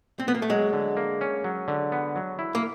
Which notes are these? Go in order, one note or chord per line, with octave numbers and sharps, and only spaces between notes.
C4
B3
A#3
A3
F#3 G#3
D3
A#3
C#4
F#3
D3
B3
F#3
E4
A#3